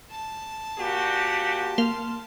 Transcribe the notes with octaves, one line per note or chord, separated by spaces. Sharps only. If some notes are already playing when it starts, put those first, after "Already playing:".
A5
A#2 F#4 G4
A#3 C6 F6